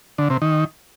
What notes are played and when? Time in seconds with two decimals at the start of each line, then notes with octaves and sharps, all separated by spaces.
0.18 D3
0.30 C3
0.42 D#3